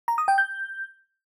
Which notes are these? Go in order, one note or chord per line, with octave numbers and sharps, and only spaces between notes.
A#5
D#6
G5
G6